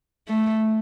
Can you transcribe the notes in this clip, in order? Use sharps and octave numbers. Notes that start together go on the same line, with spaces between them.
A3